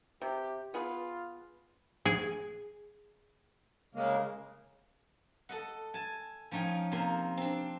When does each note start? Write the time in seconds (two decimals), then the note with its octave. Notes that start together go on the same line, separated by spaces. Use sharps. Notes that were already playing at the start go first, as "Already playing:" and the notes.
0.22 C3 G4
0.74 B3 F4 G#4 B4
2.06 G#4
3.95 C#3 G#3 A#3
5.49 A4 D#5 F#5
5.94 G#5 A5
6.51 F3 C#4 D#4 F4 G5 G#5
6.92 C3 A#3 A#4 C5 F5 C6
7.37 C4 D4